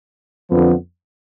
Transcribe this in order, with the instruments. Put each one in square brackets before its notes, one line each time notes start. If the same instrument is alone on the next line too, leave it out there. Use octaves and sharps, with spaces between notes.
[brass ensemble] F2 D3 F3 B3